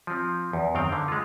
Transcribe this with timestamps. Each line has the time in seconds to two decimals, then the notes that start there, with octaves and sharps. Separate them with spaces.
0.07 F3 C4
0.53 E2
0.75 F#2 D#3 C4 F5 G5
0.92 D3
1.08 G#3 F4